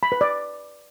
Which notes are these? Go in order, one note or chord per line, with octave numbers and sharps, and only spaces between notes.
B5
B4
D5